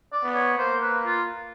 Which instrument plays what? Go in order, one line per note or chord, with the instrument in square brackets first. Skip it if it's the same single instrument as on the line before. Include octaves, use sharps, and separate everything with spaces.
[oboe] D5
[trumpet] B3
[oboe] C#5
[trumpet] A#3 [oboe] C5
[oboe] B4
F4